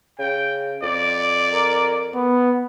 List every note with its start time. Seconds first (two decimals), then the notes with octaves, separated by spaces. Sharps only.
0.19 C#3 G5
0.82 F2 D5
1.53 A#4
2.15 B3